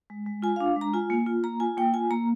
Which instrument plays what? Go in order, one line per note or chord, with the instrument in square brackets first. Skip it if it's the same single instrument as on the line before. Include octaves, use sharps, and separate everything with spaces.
[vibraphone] G#3
G#3
F4 G#5
F5
D4
G#3
A#5
F4 G#5
A#3
F4
A#3 A#5
F4 G#5
A#3 G5
F4 G#5
A#3 A#5